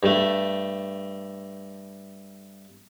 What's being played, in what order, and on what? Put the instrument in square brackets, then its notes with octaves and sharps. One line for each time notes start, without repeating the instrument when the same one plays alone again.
[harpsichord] G2 A3